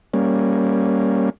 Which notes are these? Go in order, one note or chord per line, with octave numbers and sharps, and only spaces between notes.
G3 A#3 C#4